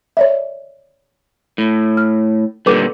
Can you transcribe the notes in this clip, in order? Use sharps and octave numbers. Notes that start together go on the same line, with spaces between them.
C#5 D5 E5
A2
F6
A#2 D3 G3 A4 B4 D6